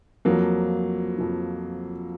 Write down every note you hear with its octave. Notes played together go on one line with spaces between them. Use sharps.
F2 F3 F#3 A#3
F2 F3